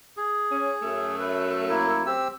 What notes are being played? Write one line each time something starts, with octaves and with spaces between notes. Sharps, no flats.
G#4
C#4
F#2 A3
B4
A#3 E4
C4 G4 E6